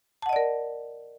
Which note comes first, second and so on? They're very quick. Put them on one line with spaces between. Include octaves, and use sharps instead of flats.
A5 F#5 D#5 D5 A#4